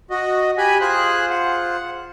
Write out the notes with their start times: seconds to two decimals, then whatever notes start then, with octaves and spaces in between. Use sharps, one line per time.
0.11 F#4 D#5
0.58 G4 G#5 B5 F#6
0.81 F4 G#4 C5 F#6
1.30 F#5